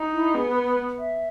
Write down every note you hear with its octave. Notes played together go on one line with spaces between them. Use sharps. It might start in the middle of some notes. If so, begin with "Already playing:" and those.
Already playing: D#4
E4
B3 G#4
B4
B4
E5